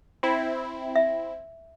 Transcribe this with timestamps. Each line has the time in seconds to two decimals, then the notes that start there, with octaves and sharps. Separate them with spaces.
0.23 C4 E4
0.96 E5